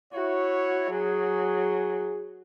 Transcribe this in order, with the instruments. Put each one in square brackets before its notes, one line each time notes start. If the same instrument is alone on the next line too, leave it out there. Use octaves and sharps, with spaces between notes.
[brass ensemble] E4 C#5 [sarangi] F#4
[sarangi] F#3 [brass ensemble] G#4